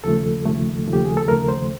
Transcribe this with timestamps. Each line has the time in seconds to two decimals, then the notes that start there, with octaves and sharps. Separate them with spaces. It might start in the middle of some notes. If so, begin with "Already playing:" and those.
0.04 D#2 C#3 F3 A3 A4
0.45 D#2 C#3 F3 A3
0.87 D#2 C#3 F3 A3
0.93 G4
1.05 G#4
1.17 A4
1.28 D#2 C#3 F3 A3 A#4
1.48 C5